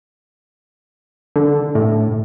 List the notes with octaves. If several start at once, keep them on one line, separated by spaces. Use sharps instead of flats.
D3
A2